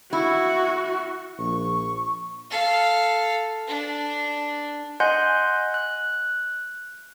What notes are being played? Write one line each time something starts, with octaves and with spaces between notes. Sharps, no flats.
E4 F#4
A#1 C#6
A4 F5
D4
D#5 F#5 G#5 C6 F#6 G6
F#6